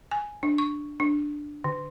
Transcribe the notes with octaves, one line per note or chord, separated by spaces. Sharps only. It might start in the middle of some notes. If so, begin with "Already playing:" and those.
G#5
D4
C#6
D4
D3